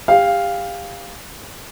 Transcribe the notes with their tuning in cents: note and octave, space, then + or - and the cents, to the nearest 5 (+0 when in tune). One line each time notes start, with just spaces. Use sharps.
G4 +30 F5 +0